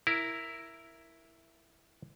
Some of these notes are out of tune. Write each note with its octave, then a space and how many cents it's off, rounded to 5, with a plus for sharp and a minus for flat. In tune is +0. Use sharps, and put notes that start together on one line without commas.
E4 +0 A#4 +0